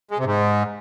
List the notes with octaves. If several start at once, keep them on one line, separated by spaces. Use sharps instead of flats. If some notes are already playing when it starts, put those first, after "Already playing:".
G#3
C3
G#2